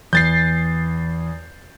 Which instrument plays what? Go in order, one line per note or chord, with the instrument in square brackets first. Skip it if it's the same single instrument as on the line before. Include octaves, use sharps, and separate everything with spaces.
[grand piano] E2 [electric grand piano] G6 A6 C7